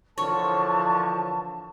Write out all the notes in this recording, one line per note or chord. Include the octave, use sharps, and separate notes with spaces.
D3 E3 F3 A#4 C#5 A5 C#6